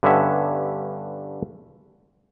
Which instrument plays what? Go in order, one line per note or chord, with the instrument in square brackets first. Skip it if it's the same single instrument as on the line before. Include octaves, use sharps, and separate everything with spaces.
[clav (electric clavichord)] G2 D3 B3 C#4 E5 F#5